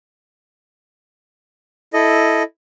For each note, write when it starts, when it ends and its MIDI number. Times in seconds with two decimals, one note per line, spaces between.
1.93 2.43 64
1.93 2.43 69
1.93 2.43 75